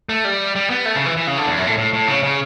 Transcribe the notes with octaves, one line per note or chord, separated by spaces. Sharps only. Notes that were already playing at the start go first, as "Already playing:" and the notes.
A3
G3
G3
B3
A3
C#3
E3
E3
C#3
D3
E2
F#2
A2
A2
A2
C#3
C#3